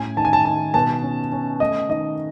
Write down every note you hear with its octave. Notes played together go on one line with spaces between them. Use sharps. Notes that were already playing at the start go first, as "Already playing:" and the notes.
Already playing: A2 C#4 G#5
D#3 A5
G#5
A5
D#3 A5
B2 A5
C#4
C#4
A3 D#5
D#3 D#5